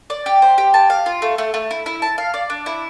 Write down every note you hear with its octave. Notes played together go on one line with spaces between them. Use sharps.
D5
G4
C5
G4
A5
F5
F4
A3
A3
A3
E4
E4
A5
F5
D5
D4
E4